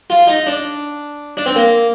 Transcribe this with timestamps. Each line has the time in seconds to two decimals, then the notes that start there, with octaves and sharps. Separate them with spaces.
0.10 F4
0.27 D#4
0.47 D4
1.37 D4
1.46 C4
1.56 A#3